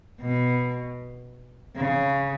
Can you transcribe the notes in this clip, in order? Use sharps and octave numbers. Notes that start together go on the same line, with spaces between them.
B2
C#3